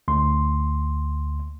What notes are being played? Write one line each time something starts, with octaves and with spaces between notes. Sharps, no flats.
D2 C6